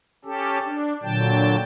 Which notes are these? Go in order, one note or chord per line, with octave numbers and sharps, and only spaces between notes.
C#4 G4 A4
D4
A#2 D3 F#3 G5 A5